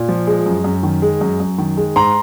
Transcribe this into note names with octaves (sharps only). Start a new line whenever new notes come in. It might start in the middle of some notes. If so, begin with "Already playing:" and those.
Already playing: A#2
F3
G#3
F#2
F#2
D#3
G#3
F#2
F#2
D#3
G#3
G#2 A#5 C6